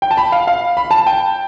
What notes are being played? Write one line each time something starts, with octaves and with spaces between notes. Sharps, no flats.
G5
A5
B5
F5
F5
B5
A5
G5